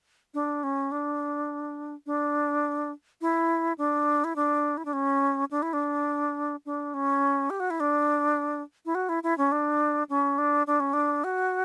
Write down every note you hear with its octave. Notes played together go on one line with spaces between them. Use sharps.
D4
C#4
D4
D4
E4
D4
E4
D4
E4
D4
C#4
D4
E4
D4
D4
C#4
G4
F#4
E4
D4
E4
F#4
E4
E4
C#4
D4
C#4
D4
D4
C#4
D4
F#4